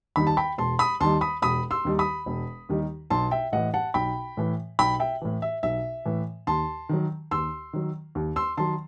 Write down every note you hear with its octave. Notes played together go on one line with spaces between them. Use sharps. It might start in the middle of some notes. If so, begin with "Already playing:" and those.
D#2 D#3 G3 D#4 B5
A5
G5 B5
E1 A5 C6
B5 D#6
D#2 D#3 G3 D#4 A5 C6
B5 D#6
E1 B5 D#6
C6 E6
D#2 D#3 G3 D#4
B5 D#6
E1
D#2 D#3 G3 D#4
B1 A5 C6
E5 G5
A2 E3 D#5 F#5
F#5 A5
B1 G5 B5
A2 E3
B1 G5 B5
E5 G5
A2 E3
E5
B1 E5
A2 E3
D#2 A5 C6
D#3 F#3
D#2 C6 E6
D#3 F#3
D#2
C6 E6
D#3 F#3 A5 C6